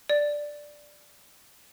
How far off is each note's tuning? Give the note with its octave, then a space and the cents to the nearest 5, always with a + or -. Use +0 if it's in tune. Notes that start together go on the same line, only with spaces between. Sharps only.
D5 +0